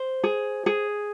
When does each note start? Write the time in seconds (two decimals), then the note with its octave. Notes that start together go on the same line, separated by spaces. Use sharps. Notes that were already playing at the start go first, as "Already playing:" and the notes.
Already playing: C5
0.24 G#4
0.66 G#4